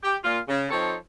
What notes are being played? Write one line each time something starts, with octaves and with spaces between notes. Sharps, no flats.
G4
A#2 F4
C#3
F3 C4 D#4 A4 C5 C#5